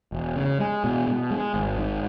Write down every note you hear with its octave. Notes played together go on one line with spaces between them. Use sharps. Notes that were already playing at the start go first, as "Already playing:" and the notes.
E1
C#3
G#3
B2
B2
G#3
G#1
G#2